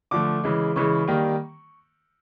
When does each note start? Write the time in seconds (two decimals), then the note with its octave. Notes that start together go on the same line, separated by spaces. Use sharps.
0.11 D3 F3 A3 D6
0.44 C#3 E3 G#3
0.76 C#3 E3 G#3 C#6
1.07 D#3 G3 A#3